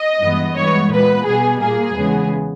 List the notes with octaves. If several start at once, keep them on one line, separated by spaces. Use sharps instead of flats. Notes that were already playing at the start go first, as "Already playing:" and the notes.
Already playing: D#5
G2 E3 G#3 B3
G2 E3 G#3 B3 C#5
A#2 G#3 B3 B4
B2 G3 B3 G#4
A#2 A#3 G#4
E2 C#3 G#3 B3